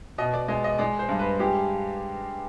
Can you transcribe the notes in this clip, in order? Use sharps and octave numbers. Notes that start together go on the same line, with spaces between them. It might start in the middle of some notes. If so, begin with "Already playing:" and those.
B2 D#5
D5
G#3 D#5
D#5
G#3 D5
C5
G2
B4
G#3 G4